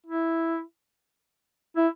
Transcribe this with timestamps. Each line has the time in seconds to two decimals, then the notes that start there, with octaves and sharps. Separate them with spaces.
0.06 E4
1.77 E4